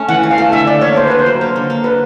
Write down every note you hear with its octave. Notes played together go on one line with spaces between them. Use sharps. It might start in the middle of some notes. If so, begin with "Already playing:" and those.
Already playing: A3 C#4
E3 F#5
E3
F5
A3
D3 E5
D3 D5
A#3 C#5
D3 C5
B4
D3
C5
F#3
A#3
D3
A#3
D3 B4